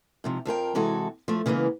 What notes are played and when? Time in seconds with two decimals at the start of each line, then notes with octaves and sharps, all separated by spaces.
0.24 G#2 C3 F3
0.45 F2 F3 A#4 G5
0.75 C3 E3 G#3 F#4 A4
1.28 F3 A3
1.46 C#3 E3 G#3 A#3 B3